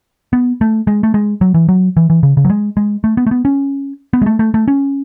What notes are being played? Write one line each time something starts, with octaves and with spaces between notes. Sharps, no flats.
B3
A3
G#3
A3
G#3
F#3
E3
F#3
E3
E3
C#3
C#3
F#3
G#3
G#3
A3
B3
A3
B3
C#4
B3
G#3
A3
A3
A3
C#4